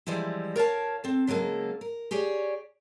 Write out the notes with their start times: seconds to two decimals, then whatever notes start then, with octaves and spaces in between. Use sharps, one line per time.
0.07 E3 F3 G3 G#3 E4
0.56 A#4 C#5 F5 A5
1.04 C4 A4
1.27 C#3 F#3 G#3 A#3 A4
1.81 A#4
2.11 G4 G#4 C#5 D5